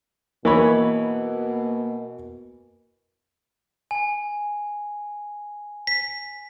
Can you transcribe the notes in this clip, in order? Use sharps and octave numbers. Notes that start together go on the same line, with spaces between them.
B2 E3 A#3 A#4 C#5 D#5 B5
G#5
B6